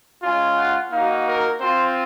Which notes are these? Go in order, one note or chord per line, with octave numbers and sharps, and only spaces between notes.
G#3 C#4 F4 G#5
F#5
A#3 D#4 F#4 F5
A#4
C4 F4 C5